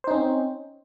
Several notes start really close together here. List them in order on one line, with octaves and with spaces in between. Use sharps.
C5 D#4 C#4 C4